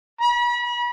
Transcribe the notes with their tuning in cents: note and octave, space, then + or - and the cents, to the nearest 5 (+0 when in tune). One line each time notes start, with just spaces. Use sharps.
B5 -35